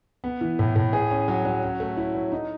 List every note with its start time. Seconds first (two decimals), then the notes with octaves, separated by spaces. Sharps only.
0.24 B3
0.41 E3
0.59 A2
0.76 A2
0.93 G#4
1.11 C#4
1.28 F#3
1.45 F#3
1.63 C#4
1.80 A3
1.97 E4
2.15 F#3
2.32 D#4